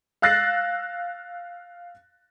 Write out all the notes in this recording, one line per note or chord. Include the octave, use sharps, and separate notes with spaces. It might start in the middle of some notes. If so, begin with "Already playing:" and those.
F5 E6 F#6 A6 A#6 C7